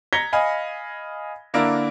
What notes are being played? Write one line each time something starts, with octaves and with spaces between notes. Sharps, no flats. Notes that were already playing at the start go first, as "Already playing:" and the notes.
A#5 G#6 A#6 B6 C#7 G7
D#5 F5 G#5 B5
D3 A#3 D4 E4 A#4